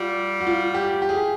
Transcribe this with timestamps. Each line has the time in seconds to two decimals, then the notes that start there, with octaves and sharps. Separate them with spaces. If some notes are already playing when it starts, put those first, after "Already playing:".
Already playing: G3 F4 F#4
0.41 F#4
0.47 F4
0.74 G4
1.02 G4
1.09 G#4
1.17 G4